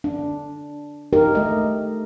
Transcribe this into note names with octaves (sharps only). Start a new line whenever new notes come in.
D4
D#4 G4 A#4
A3 D#5